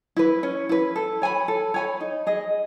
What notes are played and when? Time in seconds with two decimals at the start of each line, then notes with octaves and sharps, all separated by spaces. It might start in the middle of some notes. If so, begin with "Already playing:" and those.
0.16 E4 B4
0.43 C#4
0.69 E4 B4
0.96 A4
1.22 C#5 G#5 B5
1.48 A4
1.74 C#5 G#5 B5
2.01 D#4
2.27 G#4 D#5